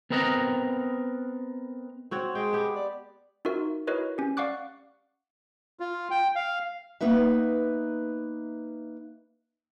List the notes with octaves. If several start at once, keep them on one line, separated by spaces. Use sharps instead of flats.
B3 C4 A#4 D#5 F#5 A#5
C4 F#4 C#5
G#3 G5
B3 G4
D5
D#4 F4 F#4 A#4 E5
E4 F#4 A#4 B4 C#5 D#5
C#4 G4
D5 F5 F#5 C#6 D6 F#6
F4
G5
F5
A#3 B3 D#4 B4 E5